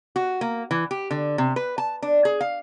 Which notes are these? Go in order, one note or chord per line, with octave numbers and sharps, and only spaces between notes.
F#4
A#3
E3
G4
D3
C3
B4
A5
D4
G#4
F5